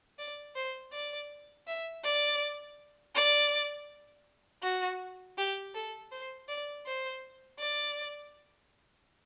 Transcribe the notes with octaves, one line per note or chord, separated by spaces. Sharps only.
D5
C5
D5
E5
D5
D5
F#4
G4
A4
C5
D5
C5
D5